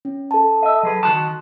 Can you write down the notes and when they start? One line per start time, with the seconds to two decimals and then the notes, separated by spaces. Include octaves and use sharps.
0.05 C#4
0.31 A4 A5
0.62 D#5 E5
0.83 F#3 G#4 B4
1.03 D#3 F#4 A5 C6